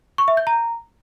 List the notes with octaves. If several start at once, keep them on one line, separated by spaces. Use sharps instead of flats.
C#6
E5
G6
A#5